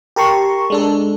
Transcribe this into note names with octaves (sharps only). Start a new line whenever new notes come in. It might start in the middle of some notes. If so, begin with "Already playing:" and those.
G4 A#4 A5 A#5 C6 C#6
G#3 D4 A4